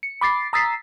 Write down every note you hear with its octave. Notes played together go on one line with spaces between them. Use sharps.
C#7
B5 D6 A6 C7
A#5 D#6 E6 A6 B6 C7